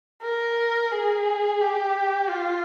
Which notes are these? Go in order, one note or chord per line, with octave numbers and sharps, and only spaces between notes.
A#4
G#4
G4
F4